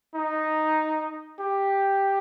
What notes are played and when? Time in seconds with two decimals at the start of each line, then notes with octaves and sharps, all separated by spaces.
0.15 D#4
1.40 G4